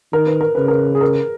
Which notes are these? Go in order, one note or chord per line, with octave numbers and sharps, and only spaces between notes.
D#3 A#4
B4
A#4
C#3 B4
A#4
G#4
A#4